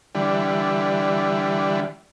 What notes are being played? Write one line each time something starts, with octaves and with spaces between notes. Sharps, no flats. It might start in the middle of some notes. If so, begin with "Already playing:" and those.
D3 E3 G3